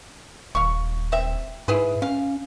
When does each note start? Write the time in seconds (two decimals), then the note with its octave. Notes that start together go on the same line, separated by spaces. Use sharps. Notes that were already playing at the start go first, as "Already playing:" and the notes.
0.55 D#1 F5 C#6
1.12 C4 E5
1.68 G#2 E4 G#4 B4
2.02 C#4 F5